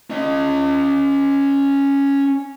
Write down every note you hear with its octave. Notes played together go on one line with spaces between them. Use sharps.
C#4 D#5